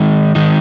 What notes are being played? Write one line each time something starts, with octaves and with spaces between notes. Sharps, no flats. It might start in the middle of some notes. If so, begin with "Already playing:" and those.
Already playing: D#3 G#3 D#4
D#3 G#3 D#4